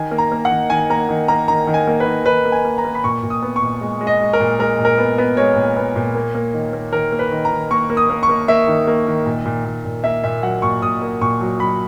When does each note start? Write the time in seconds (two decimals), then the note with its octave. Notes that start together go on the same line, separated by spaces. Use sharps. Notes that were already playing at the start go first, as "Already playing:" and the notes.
Already playing: D#3 G#5
0.11 A#3
0.18 A#5
0.32 A#3
0.45 F#5
0.51 D#3
0.70 D#3 G#5
0.90 A#3 A#5
1.09 D#3
1.28 A#3 A#5
1.48 D#3 A#5
1.67 D#3
1.74 G#5
1.87 A#3
2.00 B4
2.06 D#3
2.26 D#3 B4
2.45 A#3
2.52 G#5
2.65 A#3
2.78 A#5
2.84 A#3
2.95 B5
3.04 A#2 C#6
3.23 A#2
3.30 D#6
3.42 B3
3.56 C#6
3.62 A#2
3.81 G#3
4.01 G#3
4.07 D#5
4.21 G#3
4.33 A#4
4.40 A#2
4.59 G#3 A#4
4.79 A#2
4.85 A#4
4.98 B3
5.18 B3
5.37 G#3 C#5
5.56 A#2
5.76 B3
5.96 A#2
6.15 A#3
6.35 A#3
6.53 D#3
6.73 A#3
6.93 D#3 A#4
7.12 A#3
7.19 B4
7.32 D#3
7.45 A#5
7.51 D#3
7.71 A#3 C#6
7.90 A#3
7.97 D#6
8.10 A#3
8.23 C#6
8.29 A#3
8.48 A#3 E5
8.67 D#3
8.87 A#3
9.07 D#3
9.26 A#2
9.46 A#2
9.65 A#2
9.85 A#2
10.04 A#3 E5
10.24 A#2 E5
10.43 F#3 F#5
10.62 A#2 C#6
10.82 A#2 D#6
11.01 A#3
11.21 A#2 C#6
11.41 F#3
11.59 F#3 B5